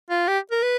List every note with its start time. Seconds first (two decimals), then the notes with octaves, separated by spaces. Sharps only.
0.10 F4
0.28 G4
0.51 A#4
0.63 B4